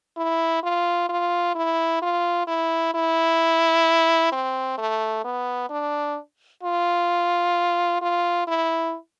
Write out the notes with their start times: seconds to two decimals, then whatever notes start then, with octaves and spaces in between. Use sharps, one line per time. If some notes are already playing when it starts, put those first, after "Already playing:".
0.17 E4
0.63 F4
1.09 F4
1.55 E4
2.02 F4
2.47 E4
2.94 E4
4.32 C4
4.78 A3
5.24 B3
5.70 D4
6.63 F4
8.01 F4
8.47 E4